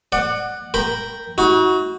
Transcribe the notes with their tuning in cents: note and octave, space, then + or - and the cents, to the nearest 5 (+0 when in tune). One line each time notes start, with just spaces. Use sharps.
D5 +35 F#5 +0
A#4 +0 G5 +0 B5 +5
D#4 +45 F#4 +0